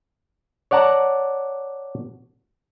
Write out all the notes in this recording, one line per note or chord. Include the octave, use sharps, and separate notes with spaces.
C#5 D5 F#5 A5 A#5